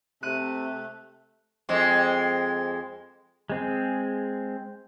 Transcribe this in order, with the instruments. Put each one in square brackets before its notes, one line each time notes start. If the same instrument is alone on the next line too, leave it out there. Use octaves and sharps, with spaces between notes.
[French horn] C3 [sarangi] A3 [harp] F#6 D#7
[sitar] F2 G#3 C4
[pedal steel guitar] G#3 C4 G#4